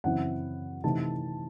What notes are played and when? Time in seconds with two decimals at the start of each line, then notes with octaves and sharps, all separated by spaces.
0.04 F#2 C#3 E3 C4 E4 F#5
0.84 C3 E3 A3 D#4 A5